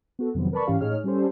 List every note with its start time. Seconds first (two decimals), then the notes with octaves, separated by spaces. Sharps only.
0.19 B3 F#4 A4
0.34 F2 C3 D#3 F#3 B3 C4
0.52 A#4 B4 D5 A5 B5 C#6
0.67 G#2 E3 C#4 G4 F5
0.81 A2 D#4 G#4 C#5 F6
1.04 G3 C#4 G4 A4 C5